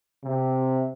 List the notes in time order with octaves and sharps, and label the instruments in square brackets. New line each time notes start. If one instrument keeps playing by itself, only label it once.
[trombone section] C3